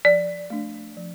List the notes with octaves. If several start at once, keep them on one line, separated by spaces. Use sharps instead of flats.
F3 D5
A3 D4
F3